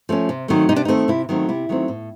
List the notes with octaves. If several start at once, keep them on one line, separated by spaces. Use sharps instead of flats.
F3 A3 C#4
C3
D#3 F#3 A3 C4
C3 D#4
D4
D#4
D#3 F#3 A3 C4
C3 E4
D#3 F#3 A3 C4
C3 E4
D#3 F#3 A3 C4
A2